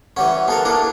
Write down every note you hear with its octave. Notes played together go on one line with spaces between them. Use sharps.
E3 G3 C#4 C#5 F#5
B3 A4 A#4 F5 G#5 A5
A#3 D4 E4 A4 A#4